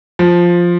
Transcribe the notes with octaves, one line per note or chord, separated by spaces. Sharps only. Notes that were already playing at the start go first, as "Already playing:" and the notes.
F3